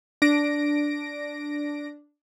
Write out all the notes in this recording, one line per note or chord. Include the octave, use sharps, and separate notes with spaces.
D4 A#6 D7